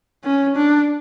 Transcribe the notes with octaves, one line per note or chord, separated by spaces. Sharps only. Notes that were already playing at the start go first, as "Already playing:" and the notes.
C#4
D4